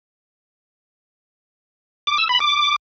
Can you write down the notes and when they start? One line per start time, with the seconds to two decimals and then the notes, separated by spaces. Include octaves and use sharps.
2.07 D6
2.18 E6
2.29 B5
2.40 D6